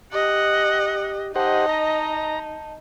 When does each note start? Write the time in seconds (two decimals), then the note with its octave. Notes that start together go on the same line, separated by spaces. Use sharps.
0.13 G4 D#5 F#5
1.36 D#4 G4 C5 D#5 F#5 A5
1.69 A#5